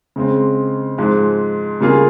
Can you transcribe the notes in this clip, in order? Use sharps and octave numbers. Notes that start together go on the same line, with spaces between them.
C#3 G#3 C4
G#2 F3 G#3
C#3 G3 A#3 F4 G#4